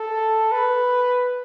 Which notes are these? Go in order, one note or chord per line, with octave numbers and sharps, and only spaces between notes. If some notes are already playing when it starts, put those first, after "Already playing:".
Already playing: A4
B4